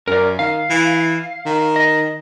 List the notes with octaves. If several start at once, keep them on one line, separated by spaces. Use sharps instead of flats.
F#2 A#4 D5
D#3 F5
E3
D#3
D#5